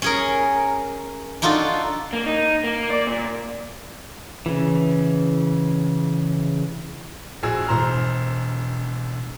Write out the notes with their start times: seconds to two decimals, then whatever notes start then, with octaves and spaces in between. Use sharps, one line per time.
0.02 C#4 G#4 A#4
1.42 D4 D#4 F4 F#4 A4
2.13 A#3
2.26 D#4
2.64 A#3
2.90 D5
3.07 A#2
4.46 C#3 E3
7.43 A#1 F#4 G#4 E6
7.67 E1 C5 A#5 F6